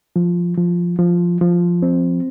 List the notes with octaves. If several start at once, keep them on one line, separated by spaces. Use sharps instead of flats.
F3
F3
F3
F3
C4